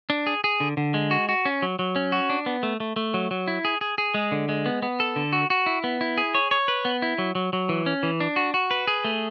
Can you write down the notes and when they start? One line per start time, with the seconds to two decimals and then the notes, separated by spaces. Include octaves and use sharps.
0.10 D4
0.27 G#4
0.44 G#4
0.60 D3
0.77 D3
0.94 G#3
1.11 F#4
1.29 F#4
1.45 C#4
1.62 F#3
1.79 F#3
1.96 C#4
2.12 F#4
2.29 D4
2.46 B3
2.63 A3
2.80 A3
2.96 A3
3.14 F#3
3.31 F#3
3.48 E4
3.65 G#4
3.81 G#4
3.98 G#4
4.14 G#3
4.32 D3
4.49 G#3
4.66 B3
4.82 B3
5.00 A4
5.16 D3
5.32 F#4
5.50 F#4
5.66 E4
5.84 B3
6.01 E4
6.18 G#4
6.35 C#5
6.51 C#5
6.68 B4
6.85 B3
7.02 E4
7.18 F#3
7.35 F#3
7.53 F#3
7.69 E3
7.86 C#4
8.03 E3
8.20 D4
8.36 F#4
8.54 F#4
8.71 B4
8.87 G#4
9.05 A3